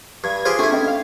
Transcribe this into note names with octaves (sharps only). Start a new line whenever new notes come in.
G2 G#6
F4 G4 G#4 C5
A3 D4 E4
C#4 D4 D#5
F5